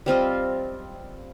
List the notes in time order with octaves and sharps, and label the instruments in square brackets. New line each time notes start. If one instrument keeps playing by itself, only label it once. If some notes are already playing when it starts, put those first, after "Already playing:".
[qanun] G3 C4 F4 D#5